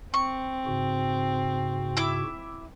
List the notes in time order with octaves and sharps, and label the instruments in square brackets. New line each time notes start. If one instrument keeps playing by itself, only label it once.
[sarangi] C4 [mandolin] C#6
[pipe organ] G#2 C#3 F#4
[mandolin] E4 E5 D6